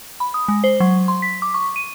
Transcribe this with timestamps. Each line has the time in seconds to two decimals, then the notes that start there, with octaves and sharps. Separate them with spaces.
0.20 B5
0.34 D#6
0.48 G#3
0.64 C5
0.80 F#3
1.08 C6
1.22 B6
1.42 D6
1.54 C#6
1.76 D#7